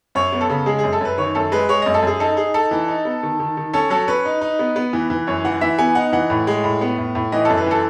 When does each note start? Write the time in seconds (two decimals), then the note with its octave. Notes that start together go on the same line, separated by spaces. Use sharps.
0.15 F#2 C#5
0.33 B3
0.41 A4
0.49 C#3
0.66 G#3 G#4
0.79 F#2 G#4
0.93 A4
1.01 F#2 B4
1.18 D#3 C#5
1.35 F#2 A4
1.52 G#3 B4
1.69 G#3 C#5
1.82 F#2 D#5
1.94 A4
2.02 F#2 G#4
2.20 D#4 A4
2.37 D#4 G#4
2.54 D#4 A4
2.71 E3
2.88 D#4
3.05 B3
3.23 D#3
3.40 D#3
3.57 D#3
3.73 C#4 A4
3.90 F#3 A4
4.08 C#4 B4
4.25 D#4
4.41 D#4
4.59 B3
4.76 B3
4.93 E3
5.10 E3
5.27 F#2 C#5
5.44 E3 F#5
5.61 E3 E5
5.78 B3 G#5
5.95 D#4 F#5
6.13 E3 F#5
6.30 A2
6.47 G#3
6.64 A2
6.81 B3
6.98 A2
7.15 A2
7.32 E3 D#5
7.45 F#2 A4
7.57 B4
7.66 E3 A4